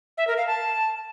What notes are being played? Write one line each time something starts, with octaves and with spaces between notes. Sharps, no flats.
E5
A#4
F5
A5